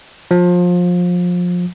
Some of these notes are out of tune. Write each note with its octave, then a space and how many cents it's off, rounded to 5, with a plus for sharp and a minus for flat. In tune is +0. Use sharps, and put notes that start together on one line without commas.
F3 +25